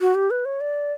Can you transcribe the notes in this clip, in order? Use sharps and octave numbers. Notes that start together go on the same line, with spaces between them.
F#4
G4
B4
C#5
D5